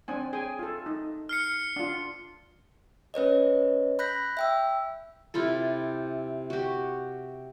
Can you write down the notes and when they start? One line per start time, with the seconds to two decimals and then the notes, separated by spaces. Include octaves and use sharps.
0.08 C4 D4 G#5
0.33 G#4 G5 G#5
0.59 F4 A4
0.86 D#4
1.29 F6 C7 C#7
1.76 D4 F4
3.14 C#4 B4 C#5 D#5
3.99 B5 F#6 G6 A#6 B6
4.37 E5 G5 E6
5.34 C3 E4 F4 A4
6.50 F#4 G4